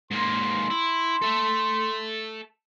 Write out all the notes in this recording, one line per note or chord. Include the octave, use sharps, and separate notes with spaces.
G#2 A#3 C6
E4
A4 E5